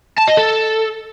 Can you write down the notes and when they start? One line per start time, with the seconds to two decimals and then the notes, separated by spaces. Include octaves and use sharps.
0.18 A5
0.28 D#5
0.37 A4